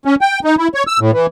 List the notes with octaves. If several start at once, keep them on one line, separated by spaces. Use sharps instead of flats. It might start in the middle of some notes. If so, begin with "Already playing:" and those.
C#4
G5
D#4
E4
C#5
E6
A2
E3